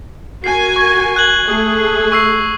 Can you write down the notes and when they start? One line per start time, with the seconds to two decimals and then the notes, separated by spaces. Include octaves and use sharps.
0.44 F#4 A#4 G#5 C7
0.76 C#6
1.16 F#6 G#6 F#7
1.45 A3 G#4
2.12 C#6 E6 C7